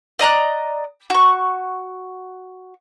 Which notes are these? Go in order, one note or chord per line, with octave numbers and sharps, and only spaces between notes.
D5 D#5 A#5 F#6
F#4 C#6